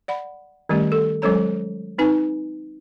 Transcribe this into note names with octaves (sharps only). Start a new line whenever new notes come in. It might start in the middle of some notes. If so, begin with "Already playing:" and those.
D5 F#5 B5
D#3 G3 A3 C#4 G4
A4
F#3 G#3 C#4 A4 C#5 A#5
C4 D#4 B4 G#5